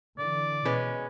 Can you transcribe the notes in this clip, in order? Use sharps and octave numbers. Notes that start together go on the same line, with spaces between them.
D3 E3 D5
B2 G#3 C#4 B4